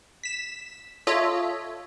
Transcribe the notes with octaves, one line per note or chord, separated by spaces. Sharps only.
B6 E7
F4 A4 C#5 D#5 E5